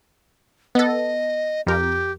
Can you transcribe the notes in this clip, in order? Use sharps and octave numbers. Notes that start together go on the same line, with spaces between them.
B3 A4 D#5
F2 G4 A#4